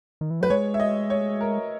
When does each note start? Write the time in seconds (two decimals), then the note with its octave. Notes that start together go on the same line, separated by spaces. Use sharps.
0.21 D#3
0.30 E3
0.41 F#3 B4
0.50 G#3 C#5
0.74 E5
0.80 D#5
1.10 C#5
1.41 A#4